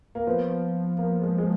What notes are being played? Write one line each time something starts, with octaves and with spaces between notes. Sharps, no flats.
A#3
F3 B3
A#3
G#3
G#3